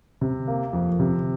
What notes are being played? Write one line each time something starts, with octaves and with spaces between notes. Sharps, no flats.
C3
A#3
F2
C3